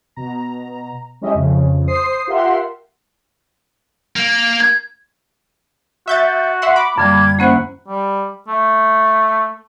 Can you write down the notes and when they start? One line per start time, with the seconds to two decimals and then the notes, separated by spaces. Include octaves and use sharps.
0.16 B2 A#5
1.21 G#3 C#4 E4 G4 D#5 E5
1.35 F2 C#3
1.87 C5 D#6 C7
2.27 F4 G4 A#4 E5 F#5 C6
4.16 A#3
4.60 G#6
6.07 F#4 E5 G6 A6
6.62 E5 F#5 C6
6.76 B5 D6
6.98 F#2 D3 G3 A#3 G#6
7.39 A#3 C#4 E4 C5 F#5
7.88 G3
8.48 A3